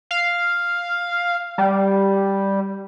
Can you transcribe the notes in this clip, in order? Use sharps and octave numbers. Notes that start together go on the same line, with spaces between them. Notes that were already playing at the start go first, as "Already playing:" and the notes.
F5
G3